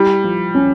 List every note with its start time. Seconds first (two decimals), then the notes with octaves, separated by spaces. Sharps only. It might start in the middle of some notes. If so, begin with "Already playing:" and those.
Already playing: G3 E4
0.24 F3
0.55 C#4